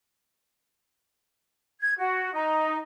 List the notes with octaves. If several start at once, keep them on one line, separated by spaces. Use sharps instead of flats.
G#6
F#4
D#4